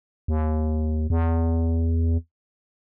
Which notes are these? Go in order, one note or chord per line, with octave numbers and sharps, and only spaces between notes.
D#2
E2